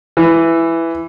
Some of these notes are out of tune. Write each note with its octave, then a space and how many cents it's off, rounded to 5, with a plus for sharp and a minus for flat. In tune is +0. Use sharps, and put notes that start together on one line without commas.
E3 +5